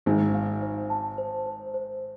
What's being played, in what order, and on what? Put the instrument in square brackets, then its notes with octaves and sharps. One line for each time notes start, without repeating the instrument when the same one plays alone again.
[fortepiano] G#1 G#2 [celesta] C5
[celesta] F5
C5
A5
C5
C5
C5